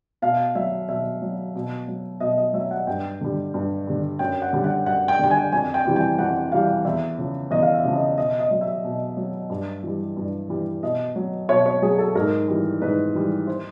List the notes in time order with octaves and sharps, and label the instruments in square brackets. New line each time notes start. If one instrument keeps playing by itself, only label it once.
[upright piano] B2 F5
F#3 E5
B2 E5
F#3
B2
F#3
B2 D#5
D#5
F#3 E5
F#5
G2 G5
D3 G3
G2
D3 G3
F#2 G5
F#5
D3 G3
F#5
F#2 F#5
G5
D3 G3 G5
G#5
F2 G#5
G5
C3 E3 G3
G5
F2 F#5
C3 E3 G3 F5
E2 E5
C#3 F3
E2 D#5
F5
E5
C#3 F3
D#5
B2 D#5
D#5
F#3
E5
B2
F#3
G2
E3 G3
G2
E3 G3
B2 D#5
F#3
B2 C#5
C#5
F#3 G#4
A4
G#2 A#4
E3 G3
G#2 B4
E3 G3
C5